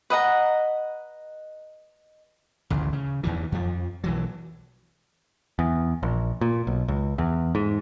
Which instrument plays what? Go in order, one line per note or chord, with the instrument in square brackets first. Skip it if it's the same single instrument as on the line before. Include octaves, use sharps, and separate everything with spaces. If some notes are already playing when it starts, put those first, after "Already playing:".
[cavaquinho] B4 D#5 F#5 A#5
[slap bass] A1 D2 C#3
C#3
E2 D#3 E3
F2 F3
B1 E3 F#3
[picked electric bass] E2
A#1
A#2
B1
C#2
E2
G#2